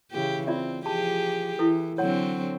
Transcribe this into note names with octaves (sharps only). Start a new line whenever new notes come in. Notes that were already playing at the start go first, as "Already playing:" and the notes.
C#3 E3 G4
C4 F4 D5 E5
F3 G4 G#4 A5
E3 E4 A4
D3 F#3 C4 C#5 F#5